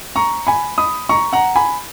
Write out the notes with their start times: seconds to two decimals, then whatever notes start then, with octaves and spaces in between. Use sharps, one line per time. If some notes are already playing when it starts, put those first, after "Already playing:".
0.16 A#5 C#6
0.47 G#5 B5
0.78 B5 D#6
1.09 A#5 C#6
1.33 F#5 A#5
1.56 G#5 B5